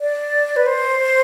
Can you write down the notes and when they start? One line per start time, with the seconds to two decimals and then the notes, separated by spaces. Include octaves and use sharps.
0.01 D5
0.56 B4
0.66 C5